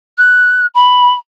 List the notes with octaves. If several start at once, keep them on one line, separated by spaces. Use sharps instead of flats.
F#6
B5